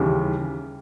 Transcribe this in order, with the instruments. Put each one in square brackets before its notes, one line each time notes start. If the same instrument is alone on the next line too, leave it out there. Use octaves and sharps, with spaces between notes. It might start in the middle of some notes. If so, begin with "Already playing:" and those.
Already playing: [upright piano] D#2 C#3 E3 G3